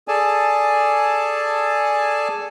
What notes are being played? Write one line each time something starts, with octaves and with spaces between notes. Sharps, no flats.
G#4 A4 D5 G#5 A5